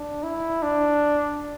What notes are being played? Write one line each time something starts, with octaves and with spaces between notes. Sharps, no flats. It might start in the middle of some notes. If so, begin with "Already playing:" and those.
Already playing: D4
E4
D4